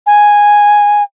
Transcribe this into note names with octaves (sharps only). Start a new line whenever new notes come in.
G#5